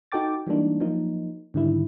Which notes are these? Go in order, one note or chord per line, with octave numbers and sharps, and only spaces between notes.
D#4 F#4 A4 G5 D6 A6
E3 G3 G#3 A#3 D4 D#4
F3 F#3 A#3 D#4
G#2 D3 D#3 G3 E4